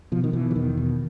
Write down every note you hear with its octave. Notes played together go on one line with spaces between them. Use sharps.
B2 F3
D#3
B2 E3
E3
E2 D#3
B2